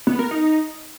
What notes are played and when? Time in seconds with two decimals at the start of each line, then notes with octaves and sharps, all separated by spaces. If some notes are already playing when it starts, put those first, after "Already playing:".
0.07 B3
0.19 A#4
0.31 D#4